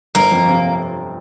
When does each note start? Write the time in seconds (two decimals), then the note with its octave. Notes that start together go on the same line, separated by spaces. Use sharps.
0.15 G1 A#3
0.31 F2
0.47 C3